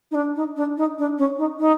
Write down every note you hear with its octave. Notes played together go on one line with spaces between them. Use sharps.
D#4
D4
D#4
D4
D#4
D4
C#4
D#4
D#4